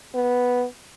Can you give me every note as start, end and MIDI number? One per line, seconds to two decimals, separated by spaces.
0.15 0.65 59